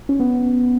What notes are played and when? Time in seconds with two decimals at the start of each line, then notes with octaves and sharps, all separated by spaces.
0.09 C#4
0.20 B3